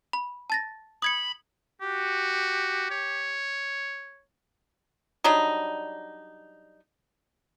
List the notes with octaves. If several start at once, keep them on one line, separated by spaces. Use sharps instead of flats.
B5
A5 A6 A#6
B5 D#6 G#6 C#7
F#4 G4
C#5
F#3 G3 D4 D#4